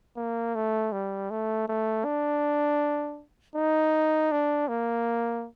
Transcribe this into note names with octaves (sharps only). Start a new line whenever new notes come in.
A#3
A3
G3
A3
A3
D4
D#4
D4
A#3